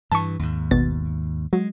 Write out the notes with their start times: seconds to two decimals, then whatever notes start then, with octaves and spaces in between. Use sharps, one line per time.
0.12 G2 E3 A5 C#6
0.39 D#2 G#2
0.71 G#1 B2 A6
1.53 F#3 G#3